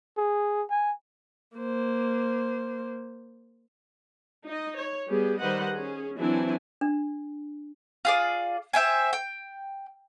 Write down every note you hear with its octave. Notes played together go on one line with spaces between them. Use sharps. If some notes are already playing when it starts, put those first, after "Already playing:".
G#4
G#5
A#3 C5
D#4 D#5
C#5
G3 B3 G4 G#4
D#3 G3 B4 C5 D#5 F#5
C#4 G#4
E3 F#3 C4 D4 E4 G#5
D4
F4 G#4 D5
C5 E5 G5 G#5
G5